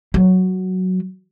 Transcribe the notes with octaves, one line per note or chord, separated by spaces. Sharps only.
F#3